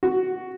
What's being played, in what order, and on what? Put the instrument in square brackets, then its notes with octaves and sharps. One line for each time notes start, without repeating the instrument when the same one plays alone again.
[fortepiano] F#4